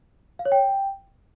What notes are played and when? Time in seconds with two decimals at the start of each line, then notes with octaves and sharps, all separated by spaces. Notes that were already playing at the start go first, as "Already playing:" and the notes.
0.39 F5
0.45 C#5
0.52 G5